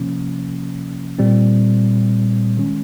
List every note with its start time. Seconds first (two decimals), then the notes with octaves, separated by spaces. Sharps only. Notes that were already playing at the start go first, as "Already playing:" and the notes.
Already playing: C3 F3 A#3 C#4
1.19 A#2 G3 C4
2.57 D#3 G#3 C#4